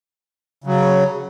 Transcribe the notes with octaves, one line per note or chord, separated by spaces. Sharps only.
C#3 F#3